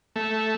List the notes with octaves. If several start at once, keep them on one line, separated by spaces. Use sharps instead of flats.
A3